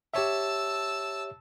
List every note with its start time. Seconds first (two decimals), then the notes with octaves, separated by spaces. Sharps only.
0.14 G4 C#5 E5 A5 E6